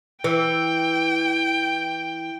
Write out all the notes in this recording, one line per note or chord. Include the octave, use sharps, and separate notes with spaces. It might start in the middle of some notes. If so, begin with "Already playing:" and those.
E3 G5